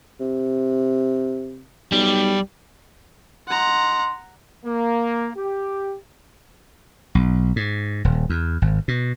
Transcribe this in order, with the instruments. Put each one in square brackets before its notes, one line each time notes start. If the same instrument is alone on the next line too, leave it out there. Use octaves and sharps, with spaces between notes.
[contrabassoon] C3
[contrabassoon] B1 [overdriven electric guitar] G3
[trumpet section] D#4 C6 [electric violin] F#5 A#5
[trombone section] A#3
G4
[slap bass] B1
G#2
D#1
E2
G#1
B2